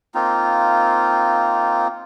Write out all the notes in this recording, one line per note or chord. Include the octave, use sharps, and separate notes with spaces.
A#3 C4 D#4 F4